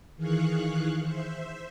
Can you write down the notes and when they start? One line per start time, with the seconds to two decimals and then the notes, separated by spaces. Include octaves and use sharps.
0.16 D#3 E3 G#4 F5 C#6 F#6
1.01 C5 E5